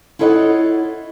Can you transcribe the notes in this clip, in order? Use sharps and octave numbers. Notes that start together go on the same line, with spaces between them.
E4 F4 A4 C#5 D#5 F#5